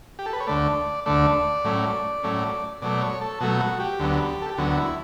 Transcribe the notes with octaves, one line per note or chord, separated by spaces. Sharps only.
G4
A4
B4
C#5
D2 D3 A3 D5
D2 D3 A3 D5
A2 F#3 A3 C#4
A2 F#3 A3 C#4
B2 F#3 A3 D5
C#5
A4
B2 F#3 A3 F#4
F#4
G4
D2 D3 F#3 B3
A4
G4
D2 D3 F#3 B3 F#4
E4